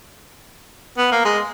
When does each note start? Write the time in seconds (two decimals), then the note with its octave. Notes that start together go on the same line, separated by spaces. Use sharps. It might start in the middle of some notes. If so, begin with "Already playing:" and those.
0.98 B3
1.12 A#3
1.25 G#3